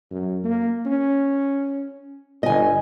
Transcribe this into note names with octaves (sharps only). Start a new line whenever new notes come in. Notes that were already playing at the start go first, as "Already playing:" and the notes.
F#2
A#3
C#4
G1 D#5 G#5